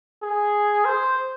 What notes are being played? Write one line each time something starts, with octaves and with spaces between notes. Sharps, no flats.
G#4
C5